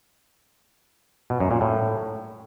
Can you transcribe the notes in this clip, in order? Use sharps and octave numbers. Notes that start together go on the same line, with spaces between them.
B2
F#2
A#2
A2